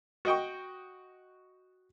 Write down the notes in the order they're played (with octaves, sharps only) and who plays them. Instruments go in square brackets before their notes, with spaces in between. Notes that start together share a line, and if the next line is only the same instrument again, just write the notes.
[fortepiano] F#4 D#5 G5 C#6